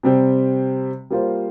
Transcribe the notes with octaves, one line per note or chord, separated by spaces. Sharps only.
C3 G3 C4
G3 A#3 F4 C5